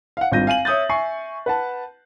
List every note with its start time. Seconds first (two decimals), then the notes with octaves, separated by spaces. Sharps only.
0.17 F5 F#5
0.31 G#1 G2 F4 G6 A#6 D#7
0.47 F5 G#5 D#7 F#7
0.65 C#5 E5 D#6 G6 A6
0.89 E5 G#5 C#6 C7
1.46 B4 F#5 A5